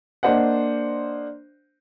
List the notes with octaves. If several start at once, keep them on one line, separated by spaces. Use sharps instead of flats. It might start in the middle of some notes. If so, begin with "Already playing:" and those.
A#3 D4 C5 D#5 F#5